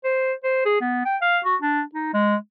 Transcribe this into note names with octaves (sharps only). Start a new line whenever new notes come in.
C5
C5
G#4
B3
G5
F5
F#4
D4
D#4
G#3